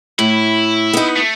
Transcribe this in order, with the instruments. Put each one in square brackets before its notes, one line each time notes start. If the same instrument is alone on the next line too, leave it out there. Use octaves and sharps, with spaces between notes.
[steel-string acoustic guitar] A2 [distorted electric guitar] E4
[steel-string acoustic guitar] B3 D#4
[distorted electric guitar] A3